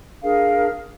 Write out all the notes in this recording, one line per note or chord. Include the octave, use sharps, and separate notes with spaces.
D4 G#4 A#4 F5